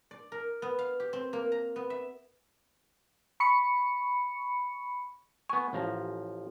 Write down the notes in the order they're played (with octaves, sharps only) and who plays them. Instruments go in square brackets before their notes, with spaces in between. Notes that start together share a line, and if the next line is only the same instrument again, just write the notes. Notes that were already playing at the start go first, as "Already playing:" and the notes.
[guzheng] D5
A#4
B3
F5
G4
C4
A#3
A#5
B3
E5
[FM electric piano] B5 C#6 C#7
[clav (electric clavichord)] B3 G#5 [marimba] C#6
[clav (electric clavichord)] A1 F3 A#5